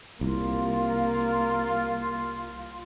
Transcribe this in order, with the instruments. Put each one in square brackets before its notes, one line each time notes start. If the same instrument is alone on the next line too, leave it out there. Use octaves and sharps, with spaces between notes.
[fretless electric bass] C2 [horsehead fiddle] A#3 [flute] F4